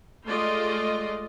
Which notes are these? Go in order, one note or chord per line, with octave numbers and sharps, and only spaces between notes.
G#3 A3 F4 D5 D#5 C6